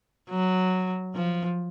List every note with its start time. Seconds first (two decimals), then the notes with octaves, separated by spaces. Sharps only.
0.30 F#3
1.15 F3